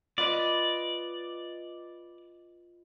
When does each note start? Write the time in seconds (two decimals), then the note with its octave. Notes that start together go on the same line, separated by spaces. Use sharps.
0.18 F4 B4 D5 D#5